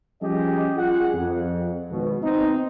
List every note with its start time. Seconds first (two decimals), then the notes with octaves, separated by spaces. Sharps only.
0.21 F3 G3 C#4 G4 G#4 D#5
0.76 F4 G#4 F#5
1.14 F2
1.90 G#1 B2
2.22 B3 C4 D#4